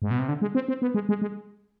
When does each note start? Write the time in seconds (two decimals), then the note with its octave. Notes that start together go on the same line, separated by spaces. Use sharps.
0.02 G#2
0.11 B2
0.19 C3
0.28 D3
0.42 G#3
0.55 C4
0.68 C4
0.82 B3
0.94 G#3
1.09 G#3
1.22 G#3